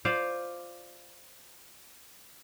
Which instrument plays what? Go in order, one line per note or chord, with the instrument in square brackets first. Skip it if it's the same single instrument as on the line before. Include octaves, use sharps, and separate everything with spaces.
[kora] F4 C5 D5 F5